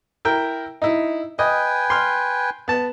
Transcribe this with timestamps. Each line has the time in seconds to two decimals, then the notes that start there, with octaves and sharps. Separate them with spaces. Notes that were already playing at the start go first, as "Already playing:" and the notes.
0.25 E4 A#4 G5
0.82 D#4 E4
1.39 B4 D#5 G5 G#5
1.90 C6 F6
2.68 B3 A5